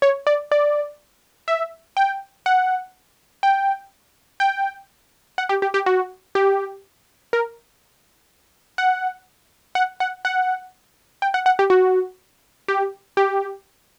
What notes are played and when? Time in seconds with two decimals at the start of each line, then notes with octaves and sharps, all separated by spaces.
0.02 C#5
0.27 D5
0.52 D5
1.48 E5
1.97 G5
2.46 F#5
3.43 G5
4.40 G5
5.38 F#5
5.49 G4
5.62 G4
5.74 G4
5.86 F#4
6.35 G4
7.33 A#4
8.78 F#5
9.75 F#5
10.00 F#5
10.25 F#5
11.22 G5
11.34 F#5
11.46 F#5
11.59 G4
11.70 F#4
12.68 G4
13.17 G4